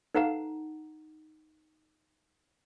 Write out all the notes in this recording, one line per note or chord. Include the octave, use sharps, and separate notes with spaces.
D#4 A4 B4 F5 F#5 A#5